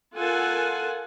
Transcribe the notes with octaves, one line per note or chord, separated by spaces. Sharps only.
F4 A4 A#4 F#5 G#5